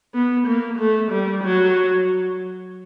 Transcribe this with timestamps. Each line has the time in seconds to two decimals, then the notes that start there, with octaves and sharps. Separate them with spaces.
0.14 B3
0.47 A#3
0.79 A3
1.11 G3
1.44 F#3